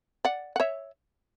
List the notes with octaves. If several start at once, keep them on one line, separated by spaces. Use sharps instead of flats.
D5 F#5
F#5
C#5 E5